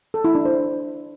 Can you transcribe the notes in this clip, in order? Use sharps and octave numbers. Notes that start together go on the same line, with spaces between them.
A4
E4
D4
C5